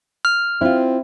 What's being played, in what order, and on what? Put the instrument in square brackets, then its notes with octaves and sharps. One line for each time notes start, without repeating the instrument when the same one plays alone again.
[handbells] F6
[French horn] C4 [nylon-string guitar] E4 F4